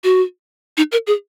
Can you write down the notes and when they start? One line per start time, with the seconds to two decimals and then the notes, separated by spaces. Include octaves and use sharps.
0.04 F#4
0.77 D#4
0.92 A#4
1.07 G#4